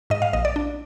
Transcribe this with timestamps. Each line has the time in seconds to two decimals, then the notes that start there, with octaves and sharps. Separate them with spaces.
0.10 G#2 D#5
0.22 F5
0.33 A#1 D#5
0.45 D5
0.56 D4